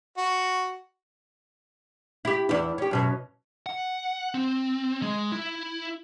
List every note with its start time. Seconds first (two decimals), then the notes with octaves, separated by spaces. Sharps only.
0.18 F#4
2.25 E4 G4
2.49 E2 E4
2.78 C#4 G4
2.91 F#2 B2 C#4
3.66 F#5
4.34 C4
5.02 G#3
5.32 E4